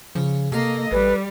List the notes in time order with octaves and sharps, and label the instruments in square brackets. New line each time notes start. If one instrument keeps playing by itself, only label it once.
[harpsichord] C#3 [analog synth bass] F3
[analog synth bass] C3 [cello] A#3 D#5 [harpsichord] A4 F5
[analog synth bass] A1 [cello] G3 [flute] B4